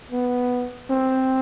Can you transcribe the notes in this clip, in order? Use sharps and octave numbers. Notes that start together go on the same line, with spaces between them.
B3
C4